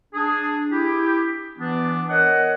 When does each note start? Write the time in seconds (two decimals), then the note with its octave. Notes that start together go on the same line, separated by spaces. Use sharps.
0.13 D4 G#4
0.70 E4 G4
1.57 E3 B3 D4
2.09 A#4 C#5 D#5 F#5